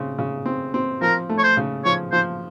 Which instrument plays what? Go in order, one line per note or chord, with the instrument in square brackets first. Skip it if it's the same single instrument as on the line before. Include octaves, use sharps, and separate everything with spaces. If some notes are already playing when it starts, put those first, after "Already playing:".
Already playing: [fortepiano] C#3 C4
C#3
C4
C4
[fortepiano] F3 [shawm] A#4
[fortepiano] A3
[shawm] C#5
C5
[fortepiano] C#3
[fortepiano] F3 [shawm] C#5
[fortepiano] F3 [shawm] C5